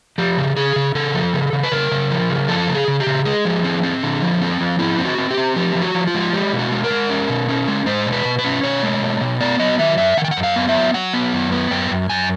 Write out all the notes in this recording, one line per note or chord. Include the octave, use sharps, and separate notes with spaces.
F3 G4
C#3
C#3 G#4
C#3
C#3 A4
F3
C#3
C#3
B4
C#3 A#4
C#3
F3
C#3
F3 A4
C#3
G#4
C#3
G4
C#3
G#3 G#4
F3
C4
C4
D3
F3
C4
F3
C4 E4
C4
F#4
C4
G4
C4
F3 G4
F3
F#4
F3
F4
G#3
G#3 G4
B2
F#4
G#3
A#4
G#3
C#4
B2
C#4
G#3
G#3 C5
B2
B4
B2
B4
C#4
B2 C#5
G#3
B2
B2
B3 D5
F#3 D#5
D#3 E5
F#2 E5
D#3 F#5
G5
F#5
F#2
F5
B3
E5
F#3
F#3 F#5
B3
F#2
B3
F#2 G5
F#2
F#2 G#5